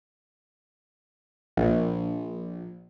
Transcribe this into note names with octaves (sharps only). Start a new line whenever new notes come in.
A#1